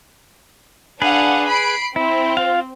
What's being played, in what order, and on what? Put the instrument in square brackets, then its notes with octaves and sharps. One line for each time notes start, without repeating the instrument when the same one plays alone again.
[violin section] D4 F5 F#5 [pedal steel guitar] G#4 B4
[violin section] B5 C7 D7
[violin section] C4 [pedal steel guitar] E4
[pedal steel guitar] F4 F5